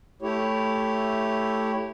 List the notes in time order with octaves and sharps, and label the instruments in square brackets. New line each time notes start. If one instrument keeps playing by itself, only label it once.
[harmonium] A3 E4 G4 C#5